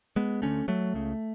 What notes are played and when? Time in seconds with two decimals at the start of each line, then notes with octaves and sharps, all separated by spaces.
0.16 G#3 B3
0.42 D2 D3 A3 C#4
0.68 F#3 A3
0.94 C#2 C#3